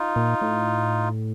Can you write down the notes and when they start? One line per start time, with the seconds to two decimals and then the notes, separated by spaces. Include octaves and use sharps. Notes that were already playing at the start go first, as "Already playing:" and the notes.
Already playing: D#4 F4
0.16 A#2
0.41 A2